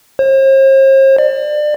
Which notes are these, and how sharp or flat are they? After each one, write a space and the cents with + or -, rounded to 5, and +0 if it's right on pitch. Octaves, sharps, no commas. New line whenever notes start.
C5 +45
D5 +30